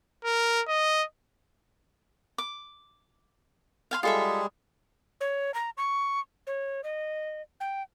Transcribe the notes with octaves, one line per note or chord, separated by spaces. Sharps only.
A#4
D#5
D6
F5 G#5 C6
G3 G#3 F4 G#4 A4 E5
C#5
A#5
C#6
C#5
D#5
G5